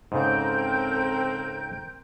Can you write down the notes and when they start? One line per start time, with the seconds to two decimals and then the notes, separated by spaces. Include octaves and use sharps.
0.12 G#2 C#3 C4 A4 A#4 G5 G6